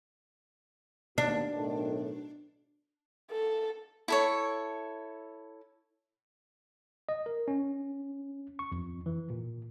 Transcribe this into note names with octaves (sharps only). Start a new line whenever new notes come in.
D#2 B2 D4
B1 A2 D#3
A4
E4 A4 C#5
D#5
A#4
C#4
C#6
F2
E3
A#2